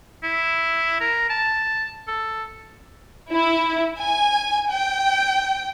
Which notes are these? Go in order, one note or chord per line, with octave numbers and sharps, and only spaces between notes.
E4
A#4
A5
A4
E4
G#5
G5